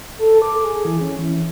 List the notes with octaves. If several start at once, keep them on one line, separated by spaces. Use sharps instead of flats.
A4
D6
G#4
E3
C#4
E3